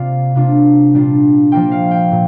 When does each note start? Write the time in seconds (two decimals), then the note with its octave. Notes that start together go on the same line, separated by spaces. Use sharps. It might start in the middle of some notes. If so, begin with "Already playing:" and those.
Already playing: C3 A#3 C4 F4 C5 D5 F5
0.35 C3 A#3 D4 F4
0.93 A#2 G3 D4 F4
1.52 F3 A#3 F4 G5
1.71 F5
1.91 G5
2.11 A#2